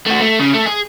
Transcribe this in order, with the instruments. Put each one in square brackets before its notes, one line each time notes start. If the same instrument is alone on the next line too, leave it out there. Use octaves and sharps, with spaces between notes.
[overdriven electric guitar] A3 F#4
A3
C#3
A3
G#4